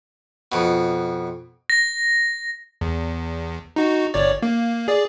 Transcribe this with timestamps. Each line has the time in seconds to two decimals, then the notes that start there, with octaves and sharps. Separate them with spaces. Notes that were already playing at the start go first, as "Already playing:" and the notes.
0.52 F2 B2
1.70 A#6
2.81 E2
3.76 D#4 F#4
4.14 G1 C#5 D5
4.42 A#3
4.88 G#4 D5